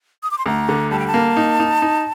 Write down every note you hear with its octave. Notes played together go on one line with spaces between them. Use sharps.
D#6
D6
C6
D2 A#5
D3
G3 A5
G5
A5
A#3
D#4
D#4
D#4